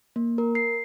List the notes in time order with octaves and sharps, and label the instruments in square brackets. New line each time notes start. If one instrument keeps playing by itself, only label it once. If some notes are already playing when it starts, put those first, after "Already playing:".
[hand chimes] A#3
A#4
C7